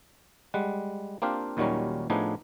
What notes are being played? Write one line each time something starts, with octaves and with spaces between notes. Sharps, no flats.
G3 G#3 F#5
A#3 C4 D4 F4 G4 F5
D#2 A#2 D#3 F#3 G3 C#4
A2 F3 B3 D4 D#4 G#4